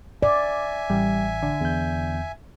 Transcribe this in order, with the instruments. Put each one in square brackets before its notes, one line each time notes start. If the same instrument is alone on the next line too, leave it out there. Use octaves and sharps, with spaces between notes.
[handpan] D5 [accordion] E5 G#5
[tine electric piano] A1 [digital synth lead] G3
[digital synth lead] D3
[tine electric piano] E2 G6